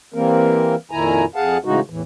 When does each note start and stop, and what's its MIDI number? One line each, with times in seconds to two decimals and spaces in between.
0.14 0.75 52
0.14 0.75 55
0.14 0.75 58
0.14 0.75 60
0.14 0.75 70
0.91 1.25 41
0.91 1.25 46
0.91 1.25 51
0.91 1.25 64
0.91 1.25 80
0.91 1.25 82
1.36 1.57 41
1.36 1.57 68
1.36 1.57 77
1.36 1.57 78
1.36 1.57 81
1.65 1.80 45
1.65 1.80 49
1.65 1.80 52
1.65 1.80 56
1.65 1.80 63
1.65 1.80 66
1.90 2.02 40
1.90 2.02 45
1.90 2.02 52